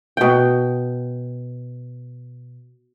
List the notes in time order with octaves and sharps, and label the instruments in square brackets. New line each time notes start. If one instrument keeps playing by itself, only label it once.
[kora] B2 G5